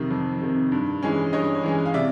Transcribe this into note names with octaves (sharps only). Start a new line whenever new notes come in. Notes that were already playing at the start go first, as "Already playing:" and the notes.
Already playing: F2 C3 D#3
F2
C3 D#3
G2
E3 G#3 C#4
G2 C#5 D#5
E3 G#3 C#4
F5
C3 D5 E5